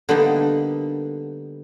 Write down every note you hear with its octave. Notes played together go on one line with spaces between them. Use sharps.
D3 G3 A#3 B3 D#4